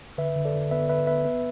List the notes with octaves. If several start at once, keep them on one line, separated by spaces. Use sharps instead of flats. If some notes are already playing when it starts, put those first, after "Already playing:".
D3 B4 E5
D3
A4 D5
D3
B3 B4 E5
D3 B4 E5
B3 B4 E5
B3